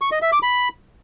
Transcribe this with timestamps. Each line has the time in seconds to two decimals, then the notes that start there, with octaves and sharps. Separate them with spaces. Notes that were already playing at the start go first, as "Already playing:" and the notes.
0.01 C#6
0.12 D#5
0.22 E5
0.32 D6
0.43 B5